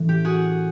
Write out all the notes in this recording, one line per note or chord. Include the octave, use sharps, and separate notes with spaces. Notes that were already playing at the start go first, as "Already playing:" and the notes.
Already playing: A2 E3 C#4
G4
F#4 G#4